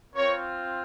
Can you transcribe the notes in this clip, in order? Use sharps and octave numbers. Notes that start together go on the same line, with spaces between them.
C4 F4 A#4 C#5